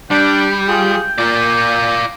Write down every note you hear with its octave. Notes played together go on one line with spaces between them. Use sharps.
G3 D4 G5
F4 G4 G#4
A#2 F4 D5